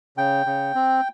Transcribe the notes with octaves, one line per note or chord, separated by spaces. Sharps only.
C#3 G5
C#3
C4